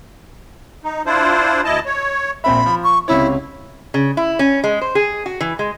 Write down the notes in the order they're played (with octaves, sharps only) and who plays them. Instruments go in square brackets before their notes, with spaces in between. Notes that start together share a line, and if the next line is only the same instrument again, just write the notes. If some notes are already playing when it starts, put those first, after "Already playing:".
[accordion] D#4
D4 E4 F4 C5
D2 E4 D#5 A5
C#5
[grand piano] A#1 C4 E5 [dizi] B5
[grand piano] F3
[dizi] C#6
[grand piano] C#2 C3 C#5 [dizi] E4
[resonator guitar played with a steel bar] C#3
E4
C#4
G#3
C5
G#4
F#4
E3
G#3